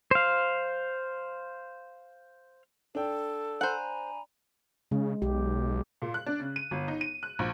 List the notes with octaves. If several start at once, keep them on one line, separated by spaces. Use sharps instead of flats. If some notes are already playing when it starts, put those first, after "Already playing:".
C5 F5
D4 A4 G5
C5 F#5 G#5 A#5 B5
C#3 G#3
B1 G4
A#2
F#6
D4
C#3
D#7
G1
D#4
D#7
F#6
A#1